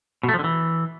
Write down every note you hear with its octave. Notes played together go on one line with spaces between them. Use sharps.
B2
A3
F3
D3
E3